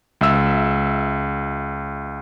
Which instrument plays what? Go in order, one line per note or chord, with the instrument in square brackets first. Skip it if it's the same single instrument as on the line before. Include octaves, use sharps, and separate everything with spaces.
[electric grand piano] C#2 E5 E6